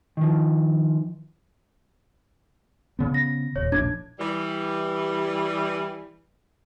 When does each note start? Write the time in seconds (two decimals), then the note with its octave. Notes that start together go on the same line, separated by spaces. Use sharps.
0.17 D#3 F3
2.99 C#3 B3
3.14 A#6
3.56 D#1 C#5
3.72 E1 A#1 D4 G#6
4.19 E3 G3